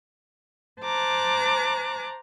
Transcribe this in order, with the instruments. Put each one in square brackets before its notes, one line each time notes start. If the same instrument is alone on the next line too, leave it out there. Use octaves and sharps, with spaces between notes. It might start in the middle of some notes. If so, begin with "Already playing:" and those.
[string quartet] C5 A5 A#5 D6 F#6